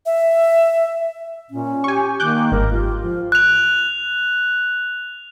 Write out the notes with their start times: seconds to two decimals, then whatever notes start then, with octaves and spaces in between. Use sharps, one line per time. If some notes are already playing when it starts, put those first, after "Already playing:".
0.06 E5
1.51 A#2 C#4
1.84 G4 G#5 C#6
2.20 D#3 A#3 D6 F#6 G6
2.52 G1 G#2 A#4
2.72 F4 G4
3.03 F3
3.32 F#6 F7